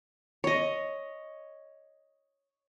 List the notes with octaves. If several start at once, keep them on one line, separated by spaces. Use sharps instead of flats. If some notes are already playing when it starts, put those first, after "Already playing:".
C#5 D#5